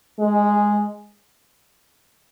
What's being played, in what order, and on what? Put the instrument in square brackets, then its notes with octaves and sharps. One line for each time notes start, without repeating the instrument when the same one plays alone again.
[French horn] G#3